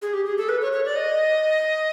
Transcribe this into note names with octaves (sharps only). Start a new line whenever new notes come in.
G#4
G4
G#4
A4
B4
C#5
C#5
D5
D#5